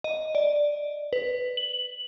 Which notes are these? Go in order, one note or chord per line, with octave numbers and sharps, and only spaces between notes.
D#5
D5
B4
F#7